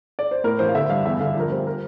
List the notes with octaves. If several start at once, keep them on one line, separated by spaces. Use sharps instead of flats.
D5
C5
A2 A#4
A1 C5
F5
D3 E5
G2 F5
E2 E5
D3 F5
A#1 A#4
G3 C5
A#4